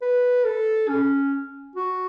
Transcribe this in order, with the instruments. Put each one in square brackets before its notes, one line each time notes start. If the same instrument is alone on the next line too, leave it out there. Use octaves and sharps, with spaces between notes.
[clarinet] B4
A4
C#4
F#4